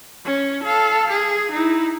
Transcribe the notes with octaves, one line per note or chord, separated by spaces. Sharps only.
C#4
A4 F5
G#4
D#4 E4